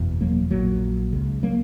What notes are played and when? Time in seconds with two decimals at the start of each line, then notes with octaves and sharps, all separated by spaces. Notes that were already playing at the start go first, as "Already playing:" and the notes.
Already playing: F#1 E2 B2
0.21 F#3 A#3
0.51 A#1 A#2 F#3 A#3
1.13 C#2 C#3
1.43 F#3 A#3